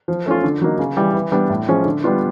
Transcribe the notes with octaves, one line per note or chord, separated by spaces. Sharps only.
F3
A3 C#4 F4
D3
F#3 A#3 D#4
C#3
E3 G3
E3
G3 B3 D4
A2
F3 G#3 C#4
D3
G3 B3 D4 F4